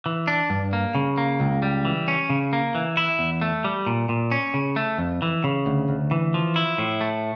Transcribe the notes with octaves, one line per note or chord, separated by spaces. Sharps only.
E3
D4
G2
A#3
C#3
A#3
C#2
G3
E3
C#4
C#3
A#3
E3
E4
E2
A3
G3
A#2
A#2
C#4
C#3
A3
F2
E3
C#3
D2
D2
E3
F3
E4
A2
A3